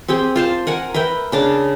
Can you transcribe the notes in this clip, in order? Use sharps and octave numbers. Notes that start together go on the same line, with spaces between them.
C4 G4 G#4 G5
F4 C5 A5
A#4 F#5 G#5
A#4 B4 E5 G5
C#3 D4 D6